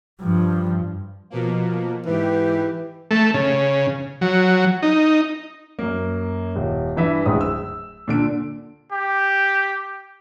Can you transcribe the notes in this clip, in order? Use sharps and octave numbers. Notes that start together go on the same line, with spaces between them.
G2 F3
B2 F3 A#3
G#2 E3 G4
A3
C#3
F#3
D#4
F#2 A#3
D#1
G2 E3 E5
D1 C#2 D#6
E6
A#2 D3 D7
G4